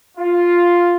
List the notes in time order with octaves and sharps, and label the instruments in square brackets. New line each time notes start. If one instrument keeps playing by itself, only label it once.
[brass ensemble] F4